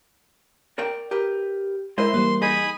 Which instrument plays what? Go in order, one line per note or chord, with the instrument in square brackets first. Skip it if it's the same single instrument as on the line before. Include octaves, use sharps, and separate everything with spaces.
[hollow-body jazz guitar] A#4 D5 G5
G4 A#4 B4
[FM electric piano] G#3 A#4 E5 [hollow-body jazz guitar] E4 C5 D#5 [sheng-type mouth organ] C6
[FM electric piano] E3 G3 A#3 [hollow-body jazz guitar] B4 C5
[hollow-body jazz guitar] D#4 G#4 D#5 [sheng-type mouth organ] G#5 B5 D#6